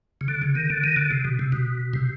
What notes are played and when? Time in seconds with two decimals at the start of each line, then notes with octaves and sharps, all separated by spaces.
0.21 C#3
0.28 D3
0.42 C#3
0.55 D#3
0.70 D3
0.84 D#3
0.96 D3
1.11 C3
1.25 B2
1.39 C3
1.52 B2
1.93 C3